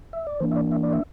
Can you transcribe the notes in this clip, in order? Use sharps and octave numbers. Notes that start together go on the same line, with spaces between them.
E5
D5
E3 A#3 D4 C5
E5
D5
E5
D5
E5